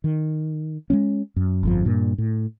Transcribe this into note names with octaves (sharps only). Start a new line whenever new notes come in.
D#3
G#3 A3 C#4
F#2
G1 F2 F3
G2 A#2
A2